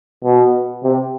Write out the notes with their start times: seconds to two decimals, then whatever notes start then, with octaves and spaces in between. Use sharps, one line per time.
0.24 B2
0.84 C3